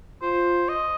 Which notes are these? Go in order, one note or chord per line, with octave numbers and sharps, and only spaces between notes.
F4 C5
D#5